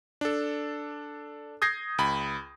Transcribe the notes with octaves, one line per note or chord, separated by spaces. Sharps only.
D4 A4
D#6 G6 G#6 A#6 C7
C#2 B5